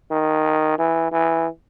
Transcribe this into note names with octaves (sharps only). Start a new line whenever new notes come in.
D#3
E3
E3